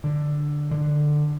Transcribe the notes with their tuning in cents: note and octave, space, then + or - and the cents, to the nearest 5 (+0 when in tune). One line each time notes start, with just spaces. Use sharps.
D3 +5
D3 +15